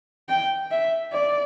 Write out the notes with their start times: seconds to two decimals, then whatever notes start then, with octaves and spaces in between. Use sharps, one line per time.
0.29 G5
0.71 E5
1.13 D5